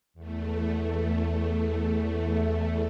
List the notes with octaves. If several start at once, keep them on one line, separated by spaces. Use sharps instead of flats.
E2 A3